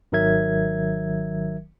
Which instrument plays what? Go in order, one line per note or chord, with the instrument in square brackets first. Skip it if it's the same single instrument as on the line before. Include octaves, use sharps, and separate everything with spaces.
[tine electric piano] G#1 D#3 F#3 A#4 E5 G#6